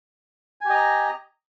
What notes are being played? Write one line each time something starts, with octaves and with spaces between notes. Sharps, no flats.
G4 D#5 G#5 A#5